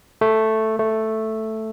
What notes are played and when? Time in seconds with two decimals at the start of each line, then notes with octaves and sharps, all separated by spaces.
0.21 A3
0.79 A3